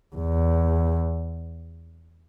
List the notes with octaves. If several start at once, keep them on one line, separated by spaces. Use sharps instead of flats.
E2